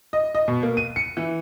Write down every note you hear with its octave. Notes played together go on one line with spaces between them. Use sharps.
D#5
D#5
B2
A#3
D#7
C#7
E3